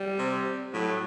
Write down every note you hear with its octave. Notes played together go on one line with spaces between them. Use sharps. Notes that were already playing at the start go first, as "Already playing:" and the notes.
Already playing: G3
C3
A2 F#3